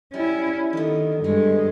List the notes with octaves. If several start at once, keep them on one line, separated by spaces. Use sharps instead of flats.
G3 C#4 E4
D3 D#3 B3
G2 G#3 A3